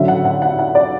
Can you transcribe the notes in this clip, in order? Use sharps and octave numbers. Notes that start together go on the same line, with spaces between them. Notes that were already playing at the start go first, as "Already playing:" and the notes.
Already playing: D3 F#3 C#4 E5
F#5
F#5
F#5
F#5
D5